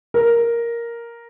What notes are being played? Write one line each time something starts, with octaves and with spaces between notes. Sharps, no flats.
A#4